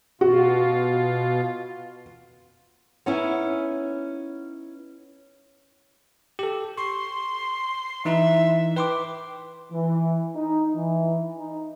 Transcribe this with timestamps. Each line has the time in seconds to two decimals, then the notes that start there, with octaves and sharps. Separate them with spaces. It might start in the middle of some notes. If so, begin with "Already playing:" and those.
0.21 B2 F4 F#4
3.06 B3 C#4 D#4 E4
6.39 G4 A4
6.77 C6 C#6
8.05 E3 D#4 E4 E5
8.76 B4 G5 C6 D6
9.72 E3
10.35 D#4
10.75 E3
11.38 D#4